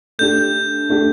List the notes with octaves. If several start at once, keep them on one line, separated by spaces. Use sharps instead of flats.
A3 D4 G4 G6
A3 D4 G4